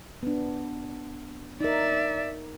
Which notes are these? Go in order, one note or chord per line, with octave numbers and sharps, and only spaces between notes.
B3 D4
D#4 A#4 D5 E5